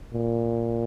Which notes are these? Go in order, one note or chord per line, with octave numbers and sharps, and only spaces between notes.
A#2